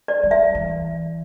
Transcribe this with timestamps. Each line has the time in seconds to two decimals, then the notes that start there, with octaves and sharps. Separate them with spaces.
0.08 D5
0.23 G3
0.31 E5
0.55 E3